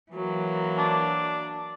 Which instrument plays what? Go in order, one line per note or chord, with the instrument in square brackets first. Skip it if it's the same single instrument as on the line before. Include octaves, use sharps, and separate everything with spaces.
[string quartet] E3 F#3 A#3
[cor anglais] D4